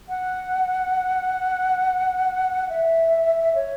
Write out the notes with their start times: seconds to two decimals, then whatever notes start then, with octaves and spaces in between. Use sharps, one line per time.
0.09 F#5
2.69 E5
3.55 C#5